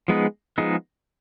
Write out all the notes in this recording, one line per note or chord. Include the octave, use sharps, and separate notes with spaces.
F3 G#3 B3 D#4 G#4
F3 G#3 B3 D#4 G#4